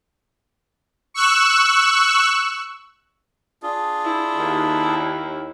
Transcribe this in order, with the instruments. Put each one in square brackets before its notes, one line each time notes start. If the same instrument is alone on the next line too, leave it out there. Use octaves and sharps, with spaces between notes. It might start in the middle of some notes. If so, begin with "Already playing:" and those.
[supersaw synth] C#6 E6 F#6 E7
[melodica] D4 F4 G#4
[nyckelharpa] E4
[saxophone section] D#2